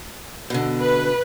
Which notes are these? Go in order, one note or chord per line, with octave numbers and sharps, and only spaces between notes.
B2 D3
B4